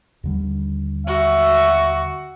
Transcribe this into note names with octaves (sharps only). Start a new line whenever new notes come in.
D#2 D3 G3
F#4 E5